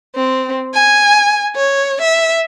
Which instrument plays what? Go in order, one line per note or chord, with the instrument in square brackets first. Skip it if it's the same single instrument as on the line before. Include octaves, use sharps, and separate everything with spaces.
[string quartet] C4
G#5
C#5
E5